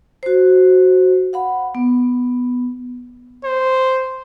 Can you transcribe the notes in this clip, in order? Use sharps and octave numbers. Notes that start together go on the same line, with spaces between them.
F#4 C5
F5 F#5 B5
B3
C5